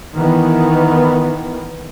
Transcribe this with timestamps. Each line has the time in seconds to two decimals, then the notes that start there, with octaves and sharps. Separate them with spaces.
0.16 D#3 E3 B3